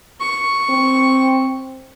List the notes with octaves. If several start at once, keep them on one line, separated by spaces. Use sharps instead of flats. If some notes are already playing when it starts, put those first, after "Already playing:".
C#6
C4